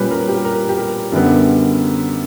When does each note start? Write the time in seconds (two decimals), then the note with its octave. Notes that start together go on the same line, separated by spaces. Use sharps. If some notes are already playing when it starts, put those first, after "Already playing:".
Already playing: A#2 G3 C#4 B4 C#5
0.11 A#4
0.28 G4
0.45 A#4
0.69 G4
0.78 A#4
1.12 F#2 D3 G3 B3